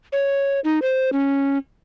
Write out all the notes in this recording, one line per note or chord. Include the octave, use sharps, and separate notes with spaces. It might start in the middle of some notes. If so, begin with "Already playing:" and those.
C#5
D#4
C5
C#4